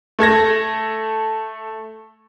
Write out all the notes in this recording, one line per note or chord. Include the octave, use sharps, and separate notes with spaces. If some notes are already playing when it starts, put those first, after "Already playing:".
A3 A4 G#6 A#6